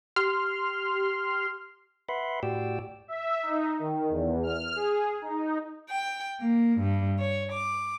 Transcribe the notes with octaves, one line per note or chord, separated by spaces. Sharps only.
G4 C6 F6
B4 E5 F#5 B5 C6
A2 F#4 G4 D5 G5 E6
E5
D#4
D#3
E2
F6
G#4
D#4
G5
A#3
G2
C#5
D6